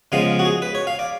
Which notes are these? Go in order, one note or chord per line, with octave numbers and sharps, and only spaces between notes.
C#3 F3 G#3 B3 F5
F#4
G#4
B4
C#5
F5
D5